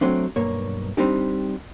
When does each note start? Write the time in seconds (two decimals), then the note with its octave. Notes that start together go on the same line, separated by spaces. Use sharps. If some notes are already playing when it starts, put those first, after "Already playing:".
0.01 F#3 A3 C4 D4
0.36 B1 G2 A#3 C#5
0.97 G3 C4 D4 D#4 G4